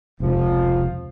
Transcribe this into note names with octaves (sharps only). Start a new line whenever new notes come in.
F1 C#2 C3 F3